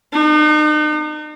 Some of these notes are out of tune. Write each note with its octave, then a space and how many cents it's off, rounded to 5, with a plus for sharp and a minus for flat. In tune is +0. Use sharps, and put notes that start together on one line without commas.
D#4 -40